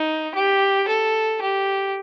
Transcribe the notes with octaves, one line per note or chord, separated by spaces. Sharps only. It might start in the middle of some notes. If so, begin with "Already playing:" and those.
Already playing: D#4
G4
A4
G4